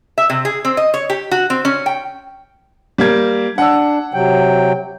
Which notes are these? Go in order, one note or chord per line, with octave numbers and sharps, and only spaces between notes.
E5
C3
G#4
C4
D#5
C#5
G4
F#4
C4
C#4
G5
G3 A#3 G#6
D4 F#5 E6
C3 F#3 G5